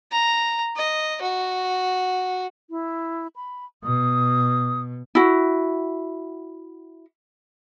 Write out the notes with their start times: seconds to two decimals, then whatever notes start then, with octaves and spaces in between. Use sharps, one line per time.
0.12 A#5
0.77 D#5
1.22 F#4
2.70 E4
3.36 B5
3.84 B2 D#6
5.15 E4 F#4